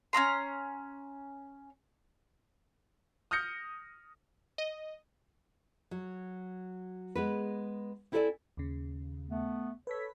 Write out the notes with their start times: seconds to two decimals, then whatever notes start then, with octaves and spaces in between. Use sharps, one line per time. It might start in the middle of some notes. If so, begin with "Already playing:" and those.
0.13 C#4 E4 A#5 C6
3.31 D#6 F6 G6 A#6 C#7
4.58 D#5
5.91 F#3
7.15 G#3 B3 B4
8.12 C4 E4 A4 C5 D5 G#5
8.57 D#2 C#3
9.28 A3 B3
9.87 A4 B4 C#5 B6